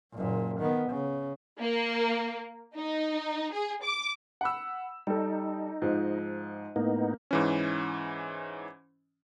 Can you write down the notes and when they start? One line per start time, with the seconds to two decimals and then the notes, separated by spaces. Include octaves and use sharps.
0.14 F#1 A#2
0.59 D#3 B3
0.89 C#3
1.60 A#3
2.75 D#4
3.53 G#4
3.83 D6
4.41 F#5 B5 E6
5.07 G3 D#4 A4
5.82 G#2 F3
6.76 A2 A#3 B3 D#4
7.31 G#2 E3 C#4